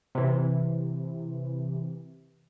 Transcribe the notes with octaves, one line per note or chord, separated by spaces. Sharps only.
C3 E3